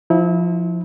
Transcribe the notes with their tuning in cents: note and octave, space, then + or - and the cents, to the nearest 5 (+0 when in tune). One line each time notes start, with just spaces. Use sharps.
F3 +0 E4 -30